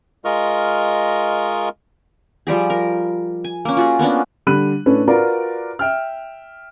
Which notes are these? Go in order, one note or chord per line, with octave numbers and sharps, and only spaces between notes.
G#3 F4 A#4 D#5 C#6 F6
F3 G3 G4 G#4
A#4
G#5
A#3 C#4
F4 F#4 G#4
A#3 B3 C#4 D4
D3 G3 B5 F#6 D#7
A2 C#4 D4 A4 B4
F4 F#4 A#4 B4 D5
E5 G5 F6